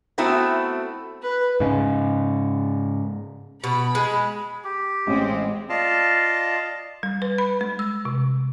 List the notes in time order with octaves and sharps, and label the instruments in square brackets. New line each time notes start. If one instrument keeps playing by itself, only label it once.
[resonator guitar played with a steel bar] A3 B3 C4 E4 F#4
[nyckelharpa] B4
[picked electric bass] G#2 C#3
[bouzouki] B2 [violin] B5
[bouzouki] G#3
[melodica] G4
[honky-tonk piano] A1 C#4 D6 [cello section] G#3 C4
[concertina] F4 D5 D#5 F5 A5
[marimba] G3
B4
B5
G#3
E6
C3